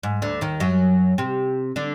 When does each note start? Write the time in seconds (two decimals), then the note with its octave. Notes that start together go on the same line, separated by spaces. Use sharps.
0.03 G#2
0.22 D2 D3
0.41 D#2 D#3
0.60 F#2 F#3
1.18 C3 C4
1.76 D3 D4